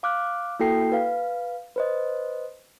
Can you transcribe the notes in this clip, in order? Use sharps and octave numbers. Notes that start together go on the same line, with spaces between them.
F5 D6 F6 F#6
A#3 E4 F#4 A4 G5 C7
B4 F5
B4 C5 D#5